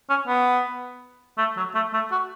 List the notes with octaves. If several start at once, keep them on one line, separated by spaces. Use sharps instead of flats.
C#4
B3
A3
F#3
A3
A3
F#4